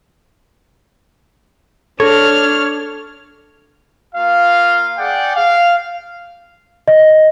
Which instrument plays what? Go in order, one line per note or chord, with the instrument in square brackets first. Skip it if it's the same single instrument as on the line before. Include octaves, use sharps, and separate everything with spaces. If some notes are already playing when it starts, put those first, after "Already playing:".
[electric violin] D4 F6 [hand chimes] A4 [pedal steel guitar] C#5
[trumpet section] A#3 F4 F5
G#4 D5 F#5 G5
F5
[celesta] D#5